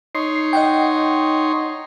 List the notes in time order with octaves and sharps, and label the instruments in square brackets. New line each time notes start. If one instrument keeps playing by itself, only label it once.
[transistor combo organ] D#4 C#5 C6 [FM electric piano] C7
[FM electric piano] D#5 F#5 G5